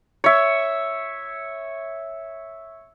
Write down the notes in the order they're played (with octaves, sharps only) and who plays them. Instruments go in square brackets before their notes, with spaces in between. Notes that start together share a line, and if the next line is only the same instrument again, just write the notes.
[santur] C#5 E5